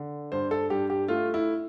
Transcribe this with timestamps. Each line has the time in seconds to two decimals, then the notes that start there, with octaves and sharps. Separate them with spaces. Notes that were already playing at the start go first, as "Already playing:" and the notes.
Already playing: D3
0.32 G2 C5
0.51 A4
0.70 G2 G4
0.90 G4
1.08 A3 F4
1.34 E4